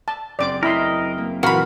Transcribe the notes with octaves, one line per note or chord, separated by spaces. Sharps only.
A5
F#1 C4 D5 C6 D6
C4 E4 A#4 D#5 E5 B5 C6 B6
A#3
A#2 E3 F#4 A#4 F5 B5 C6